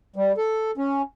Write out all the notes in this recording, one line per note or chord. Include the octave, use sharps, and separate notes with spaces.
G3
A4
C#4